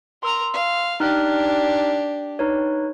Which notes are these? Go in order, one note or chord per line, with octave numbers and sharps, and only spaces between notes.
A#4 A#5 C6 E6
F5
D4 D#4 G4 F6 F#6
D#4 B4 C#5